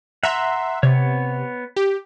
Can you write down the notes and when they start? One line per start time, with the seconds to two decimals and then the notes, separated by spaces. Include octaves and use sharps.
0.23 E5 F#5 A#5 C6
0.83 C3 B3 C#5
1.76 G4